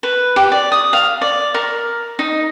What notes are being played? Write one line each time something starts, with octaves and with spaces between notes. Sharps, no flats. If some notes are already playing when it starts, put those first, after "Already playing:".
B4
G4
D5
D#6
F5
D5
A#4
D#4